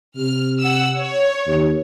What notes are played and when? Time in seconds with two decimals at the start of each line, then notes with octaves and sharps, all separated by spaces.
0.16 C3 F6
0.60 F#5 E6
0.97 C#5
1.47 D#2